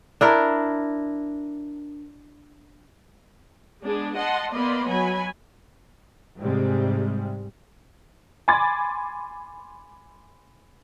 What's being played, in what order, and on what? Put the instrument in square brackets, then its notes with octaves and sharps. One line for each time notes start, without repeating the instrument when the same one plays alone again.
[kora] D4 E4 A#4
[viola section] G#3 B3 D4 G#4
D#5 F#5 A5 C6
A#3 B3 D5 D#5 B5 C6
F#3 C#5 G#5 B5
[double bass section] G#2 C3 G3 G#3
[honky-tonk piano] G#5 B5 C6 D6 G#6 A6